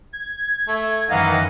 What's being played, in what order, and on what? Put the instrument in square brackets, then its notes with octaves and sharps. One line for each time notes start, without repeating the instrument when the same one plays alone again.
[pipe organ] G#6
[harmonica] A3
[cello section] F#2 D#5 [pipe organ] D#3 E3 [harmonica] D#4 F5 F#5